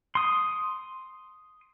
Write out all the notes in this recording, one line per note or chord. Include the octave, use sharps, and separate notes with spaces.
C6 D#6